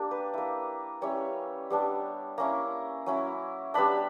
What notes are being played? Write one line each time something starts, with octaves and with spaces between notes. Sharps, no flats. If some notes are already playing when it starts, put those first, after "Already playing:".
Already playing: A#3 D4 G4
B4
A#3 E4
G3 C#4 E4 C#5
G3 B3 D4
A#3 C#4 E4 A#5
F#3 C#4 E4
G3 B3 D4 B5